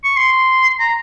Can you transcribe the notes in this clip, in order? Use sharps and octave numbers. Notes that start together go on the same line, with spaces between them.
C#6
C6
A#5